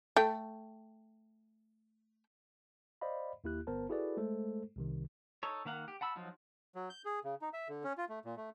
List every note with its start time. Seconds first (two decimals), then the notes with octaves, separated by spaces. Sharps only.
0.16 A3 G5
3.01 C5 D5 D#5 F5 B5
3.44 D#2 A#3 E4 G4 F#6
3.67 G1 B3 A#4 C5 A5
3.89 E4 F#4 G#4 A4 B4 D5
4.17 G#3 A3 A4 C5
4.76 C2 C3 D#3
5.43 D#4 A4 C#5
5.65 D#3 A#3 F5 F#5
5.88 G4
6.01 F#5 A5 B5 E6
6.16 F3 F#3 D#4 F4
6.75 F#3
6.90 G6
7.05 G#4
7.24 C#3
7.42 D#4
7.53 E5
7.69 D3
7.84 C#4
7.98 F4
8.09 A3
8.25 A#2
8.37 A3